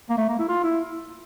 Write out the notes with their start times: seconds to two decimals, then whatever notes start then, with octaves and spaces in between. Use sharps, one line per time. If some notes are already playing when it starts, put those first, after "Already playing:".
0.10 A#3
0.18 A3
0.29 A#3
0.39 E4
0.49 F4
0.63 E4